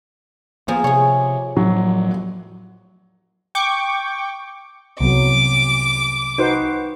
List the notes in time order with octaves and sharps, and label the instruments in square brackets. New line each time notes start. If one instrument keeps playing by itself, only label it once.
[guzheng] F3 G#4 A#5 [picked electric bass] A#3 B3
[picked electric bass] C3 [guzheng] G#4 C#5
[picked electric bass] A2 F3 [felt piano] F#3
[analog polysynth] G5 C#6 D6
[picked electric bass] C2 [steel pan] F#3 B3 [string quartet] D6
[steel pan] D#4 C5 [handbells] F#4 B4 F#5